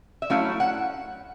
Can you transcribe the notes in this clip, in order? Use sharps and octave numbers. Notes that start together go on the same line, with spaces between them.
E5
F#3 A3 C#4 E4 F5
F#5